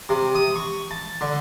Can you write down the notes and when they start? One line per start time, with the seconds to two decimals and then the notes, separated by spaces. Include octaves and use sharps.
0.09 C3
0.35 D#6
0.56 C#6
0.91 A5
1.21 D3